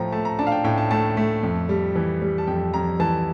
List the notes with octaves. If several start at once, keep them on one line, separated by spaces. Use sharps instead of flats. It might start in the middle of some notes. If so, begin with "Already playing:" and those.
Already playing: A2 F3 A3 G5 A#5
A3 A5
A#5
D4 A5
F5
G5
A2 G5
A5
A3 A5
A3
F2
G3
E3
G3
A5
F2 G5
F2 A#5
E3 A5